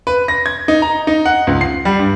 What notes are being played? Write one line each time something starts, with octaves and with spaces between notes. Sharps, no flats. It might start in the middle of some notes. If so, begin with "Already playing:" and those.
B4
A#6
G#6
D#4
A#5
D#4
F#5
C#2
C7
G3
G2